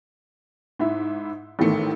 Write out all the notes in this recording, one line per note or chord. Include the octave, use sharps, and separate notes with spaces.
G#2 E4 E5
A1 G#2 D#3 A3 C#7